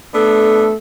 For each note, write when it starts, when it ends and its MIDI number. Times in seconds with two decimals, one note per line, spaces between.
0.14 0.75 57
0.14 0.71 59
0.14 0.71 62
0.14 0.71 69